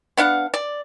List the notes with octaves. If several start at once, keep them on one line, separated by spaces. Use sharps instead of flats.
B3 D4 F5 F#5
D5